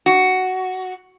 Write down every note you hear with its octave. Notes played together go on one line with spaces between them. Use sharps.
F#4